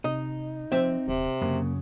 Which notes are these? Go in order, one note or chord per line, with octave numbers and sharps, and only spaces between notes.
C3 D#4 D#5
F3 C4 E5
D#1 C3
F#2 C#3 A#3